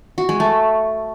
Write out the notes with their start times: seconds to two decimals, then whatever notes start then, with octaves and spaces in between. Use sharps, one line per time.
0.18 F#4
0.29 G#3
0.40 A3